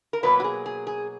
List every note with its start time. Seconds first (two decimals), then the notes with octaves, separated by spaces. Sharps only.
0.13 A#4
0.23 B2 F#3 A#3 B4
0.40 F#4
0.44 G#4
0.66 G#4
0.87 G#4